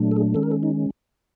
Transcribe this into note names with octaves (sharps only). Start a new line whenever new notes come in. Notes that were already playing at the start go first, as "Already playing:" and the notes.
Already playing: A#2 F#3 A3 D4
A4
G#4
D#3 G#3 C#4 A4
A#4
A4
D#4